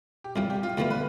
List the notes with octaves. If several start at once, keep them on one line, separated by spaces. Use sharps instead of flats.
G4
C2 C3 G3 F4
G4
F4
D2 D3 F3 B3 E4 F4
B4